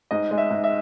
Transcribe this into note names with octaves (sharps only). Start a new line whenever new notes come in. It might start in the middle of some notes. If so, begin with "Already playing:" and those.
G#2 D#5
G#3
E5
G#2
E5